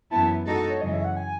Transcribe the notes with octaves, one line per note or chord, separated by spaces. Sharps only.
F#2 E3 B3 E4 A5
G#3 D#4 F#4 A4
C#5
F#2 C#3 E3 G#3 C#4 D#5
E5
F#5
G#5